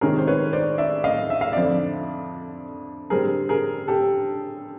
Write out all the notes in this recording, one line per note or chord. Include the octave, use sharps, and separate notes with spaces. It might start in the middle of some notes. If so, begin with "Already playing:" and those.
C3 D#3 G#3 C#4 G#4 A#4
C5
B4 C#5
C5 D5
D5 E5
D#5 F5
E5
F5
F2 D3 F3 D5 E5
D3 G3 C4 G#4 A#4
G#4 A#4
G4 A4